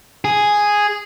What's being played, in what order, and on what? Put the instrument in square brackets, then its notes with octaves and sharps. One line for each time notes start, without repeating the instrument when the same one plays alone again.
[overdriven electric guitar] G#4